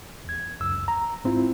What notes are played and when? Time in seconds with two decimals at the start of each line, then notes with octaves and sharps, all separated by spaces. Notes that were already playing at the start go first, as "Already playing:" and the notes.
0.25 E2 G#6
0.60 C#2 F#2 E6
0.88 A#5
1.24 G#2 C4 E4 F4